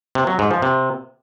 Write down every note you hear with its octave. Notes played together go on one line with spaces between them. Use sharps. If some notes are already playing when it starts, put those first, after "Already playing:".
C3
F#3
G#2
F3
C3